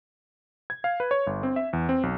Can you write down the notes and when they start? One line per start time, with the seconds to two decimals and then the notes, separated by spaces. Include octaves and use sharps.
0.70 G#6
0.84 F5
1.00 B4
1.11 C#5
1.27 G1
1.43 C4
1.56 E5
1.73 E2
1.89 C4
2.03 B1